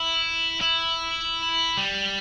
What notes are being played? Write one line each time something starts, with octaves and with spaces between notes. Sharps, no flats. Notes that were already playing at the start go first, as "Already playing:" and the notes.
Already playing: E4
E4
G3